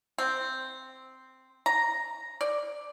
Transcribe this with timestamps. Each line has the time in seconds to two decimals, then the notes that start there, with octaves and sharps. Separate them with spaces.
0.18 C4
1.66 A#5
2.41 D5